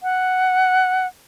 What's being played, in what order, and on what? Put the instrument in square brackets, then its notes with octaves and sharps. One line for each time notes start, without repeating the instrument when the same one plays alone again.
[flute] F#5